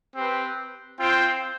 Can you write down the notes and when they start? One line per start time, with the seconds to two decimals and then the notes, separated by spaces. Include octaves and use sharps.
0.16 C4 G4 B4
0.97 C4 F4 C5 G5